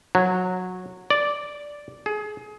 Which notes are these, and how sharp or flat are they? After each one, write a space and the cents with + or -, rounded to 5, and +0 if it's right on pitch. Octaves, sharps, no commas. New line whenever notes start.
F#3 -15
D5 -5
G#4 +25